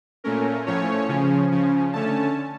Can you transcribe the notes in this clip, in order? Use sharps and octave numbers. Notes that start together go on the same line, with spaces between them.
A#2 A3 C#4 A#4
A2 F3 A3 C#4 C#5
C#3 F3 C#4
C#3 F3 C#4
D3 A3 C#4 A5